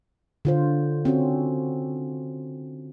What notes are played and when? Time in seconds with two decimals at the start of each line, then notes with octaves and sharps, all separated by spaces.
0.45 D3 F4 C5
1.05 C4 C#4 F#4